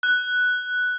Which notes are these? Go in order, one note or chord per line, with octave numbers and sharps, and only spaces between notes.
F#6